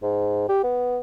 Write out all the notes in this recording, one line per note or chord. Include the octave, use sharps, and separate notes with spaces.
G#2
G4
B3